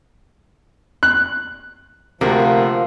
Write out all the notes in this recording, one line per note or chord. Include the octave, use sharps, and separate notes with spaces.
F#6
D2 C3 F3 A#3 F#4